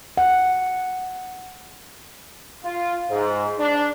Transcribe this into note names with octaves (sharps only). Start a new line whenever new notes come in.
F#5
F4
G#2
D4